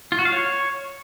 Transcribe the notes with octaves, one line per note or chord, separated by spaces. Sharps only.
F4
F#4
F5
C#5